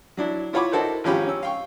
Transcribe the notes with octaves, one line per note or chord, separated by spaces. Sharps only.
F#3 D4 E4
E4 F4 C#5 F#5 B5 D6
D#4 E4 F#4 A4 A#4 C5
G#1 F3 C#4 G4 F5 B5
C#4 E6
F5 G5 C#6